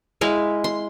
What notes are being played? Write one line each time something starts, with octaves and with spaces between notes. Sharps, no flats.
G#3 E4 F5
C6